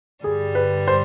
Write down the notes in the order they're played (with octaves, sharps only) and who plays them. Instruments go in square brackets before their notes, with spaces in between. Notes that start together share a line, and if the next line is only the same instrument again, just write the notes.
[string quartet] G2 D3 G3 [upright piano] G#4
[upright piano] B4
C5